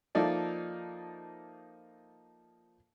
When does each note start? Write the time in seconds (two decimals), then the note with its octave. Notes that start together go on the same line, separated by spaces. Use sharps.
0.15 F3 A#3 D#4 A4 D5 E5